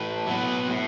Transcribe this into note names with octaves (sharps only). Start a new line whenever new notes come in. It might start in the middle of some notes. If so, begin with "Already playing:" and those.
Already playing: A2 B4
F#3 B3
A2